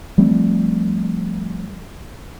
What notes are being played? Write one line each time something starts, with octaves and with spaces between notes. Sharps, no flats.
F3 G3 A3 C4